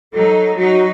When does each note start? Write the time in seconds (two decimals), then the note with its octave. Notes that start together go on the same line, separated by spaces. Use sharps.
0.13 F#3 D#4 A4
0.56 F#3 D#4 F#4